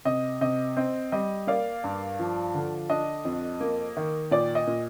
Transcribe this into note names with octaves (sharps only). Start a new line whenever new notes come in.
C3 D#5
C3 D#5
C4 D#5
G3 D#5
A#3 D5 F5
G2
F3
D3
D4 D#5
F2
A#3
D#3
A#2 D5
D#5
A#2